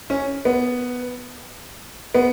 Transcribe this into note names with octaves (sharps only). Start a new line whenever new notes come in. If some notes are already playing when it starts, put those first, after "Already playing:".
C#4
B3
B3